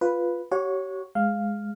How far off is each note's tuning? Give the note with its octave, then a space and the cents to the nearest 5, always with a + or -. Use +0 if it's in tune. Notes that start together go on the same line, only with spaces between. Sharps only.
F4 +0 B4 +0
G4 -40 C#5 +0 F#5 -30
G#3 +0 F5 +0